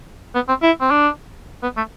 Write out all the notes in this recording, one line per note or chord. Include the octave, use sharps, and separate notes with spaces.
B3
C4
E4
C4
D4
B3
A3